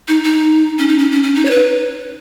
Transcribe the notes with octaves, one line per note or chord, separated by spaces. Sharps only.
D#4
D#4
C#4
D#4
C#4
C#4
C#4
D#4
C#5
B4